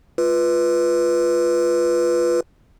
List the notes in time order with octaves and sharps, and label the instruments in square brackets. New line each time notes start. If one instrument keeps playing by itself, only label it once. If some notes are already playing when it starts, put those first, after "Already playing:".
[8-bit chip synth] F4 B4